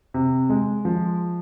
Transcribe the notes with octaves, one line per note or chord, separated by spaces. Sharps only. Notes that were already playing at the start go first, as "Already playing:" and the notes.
C3
G#3
F3